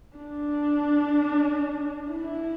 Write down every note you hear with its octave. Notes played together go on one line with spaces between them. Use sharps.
D4
E4